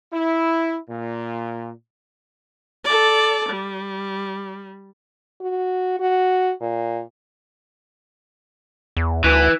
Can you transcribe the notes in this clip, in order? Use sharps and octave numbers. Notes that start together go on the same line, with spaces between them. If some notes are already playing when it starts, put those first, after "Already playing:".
E4
A#2
A4 D5
G3
F#4
F#4
A#2
E2
D2 E3